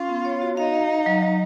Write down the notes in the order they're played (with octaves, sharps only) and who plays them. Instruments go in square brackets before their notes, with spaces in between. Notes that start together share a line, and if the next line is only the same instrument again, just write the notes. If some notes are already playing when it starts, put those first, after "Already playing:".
Already playing: [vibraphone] C#4 [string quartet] F4
[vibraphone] B3
C#5
F#4
[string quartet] D#4 [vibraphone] F5
[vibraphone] F5
F5
F#3
F#3